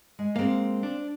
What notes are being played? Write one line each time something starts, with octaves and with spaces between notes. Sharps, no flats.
G#3
G#3 A#3 C4 F5
D4